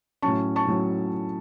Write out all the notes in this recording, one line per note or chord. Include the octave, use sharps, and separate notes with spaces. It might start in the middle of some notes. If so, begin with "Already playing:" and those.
A2 F#3 C#4 A5 C#6
A5 C#6
A2 F#3 C#4